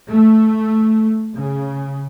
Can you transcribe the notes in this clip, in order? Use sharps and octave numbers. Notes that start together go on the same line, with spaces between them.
A3
C#3